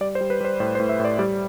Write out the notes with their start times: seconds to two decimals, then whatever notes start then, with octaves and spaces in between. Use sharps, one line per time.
0.01 G3 D5
0.15 C5
0.21 G3
0.30 B4
0.41 G3 C5
0.60 A2 C5
0.75 C5
0.80 A2
0.89 E5
1.00 A2
1.05 D5
1.19 G3 D5